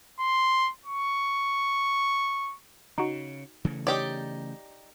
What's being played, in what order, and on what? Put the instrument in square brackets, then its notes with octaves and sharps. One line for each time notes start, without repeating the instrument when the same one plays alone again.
[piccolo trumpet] C6
C#6
[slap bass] C#3 [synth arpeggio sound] D#4 F#4
[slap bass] C#3 E3 A3
[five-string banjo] D#4 G4 D5 [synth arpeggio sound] C#5